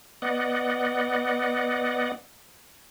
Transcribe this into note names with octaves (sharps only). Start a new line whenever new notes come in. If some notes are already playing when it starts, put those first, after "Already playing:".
B3 D5 D#5 F#5